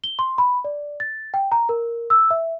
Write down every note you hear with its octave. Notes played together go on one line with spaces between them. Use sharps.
G7
C6
B5
D5
A6
G5
A#5
A#4
E6
E5